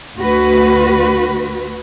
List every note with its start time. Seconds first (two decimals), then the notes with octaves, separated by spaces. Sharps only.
0.18 D2 F#4 B4